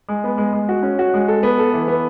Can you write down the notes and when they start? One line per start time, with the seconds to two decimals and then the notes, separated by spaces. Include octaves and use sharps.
0.09 G#3
0.24 B3
0.38 G#3
0.53 G#3
0.69 F#4
0.83 C#4
0.99 F#4
1.14 G#3
1.28 A4
1.43 B3
1.59 A4
1.74 E3
1.88 B3